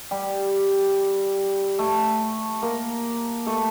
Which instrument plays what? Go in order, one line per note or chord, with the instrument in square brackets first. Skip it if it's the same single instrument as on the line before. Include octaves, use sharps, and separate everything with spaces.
[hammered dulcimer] G3 G4
A3 A4
A#3 A#4
A3 A4